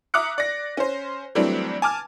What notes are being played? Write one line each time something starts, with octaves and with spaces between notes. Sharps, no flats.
E5 A#5 D6 D#6 F#6 C#7
D5 A#6
C#4 C5
E3 F#3 G3 A3 C4 D4
G#5 A5 D6 F6